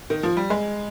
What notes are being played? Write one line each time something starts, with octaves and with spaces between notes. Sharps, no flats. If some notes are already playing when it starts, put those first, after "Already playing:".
D#3
F3
G3
G#3